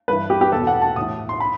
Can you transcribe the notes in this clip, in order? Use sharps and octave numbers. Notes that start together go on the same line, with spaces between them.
G2 E3 B4
G4
G4
E2 B2 A4
F#5
A5
A2 E3 D#6
C6
B5